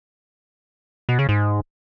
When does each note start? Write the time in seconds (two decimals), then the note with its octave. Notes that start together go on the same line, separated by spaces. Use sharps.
1.09 B2
1.19 C#3
1.29 G#2